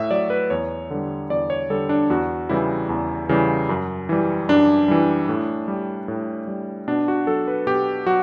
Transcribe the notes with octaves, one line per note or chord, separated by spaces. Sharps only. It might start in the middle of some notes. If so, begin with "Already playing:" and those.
Already playing: A2 E5
F#3 D5
B4
E2 C#5
D3 G3
E2 D5
C#5
D3 G3 A4
D4
E2 F#4
C#3 E3 G3 E4
E2
C#3 E3 G3
F#2
E3 G3
F#2 D4
E3 G3
A2
G3
A2
G3
B2 D4
F#4
F#3 A4
B4
B2 G4
F#3 F#4